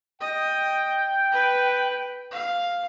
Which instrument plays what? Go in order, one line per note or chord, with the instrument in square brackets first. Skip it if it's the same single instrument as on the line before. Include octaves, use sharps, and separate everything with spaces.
[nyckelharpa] D#5 [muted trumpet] G5
[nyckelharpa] B4
F5